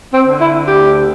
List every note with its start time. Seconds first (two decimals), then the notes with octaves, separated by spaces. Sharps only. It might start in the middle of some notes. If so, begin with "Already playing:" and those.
0.14 C4
0.27 D3
0.40 E4
0.67 D2 G4